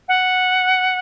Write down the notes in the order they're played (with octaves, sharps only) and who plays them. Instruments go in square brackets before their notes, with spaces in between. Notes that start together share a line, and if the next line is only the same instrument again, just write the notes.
[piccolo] F#5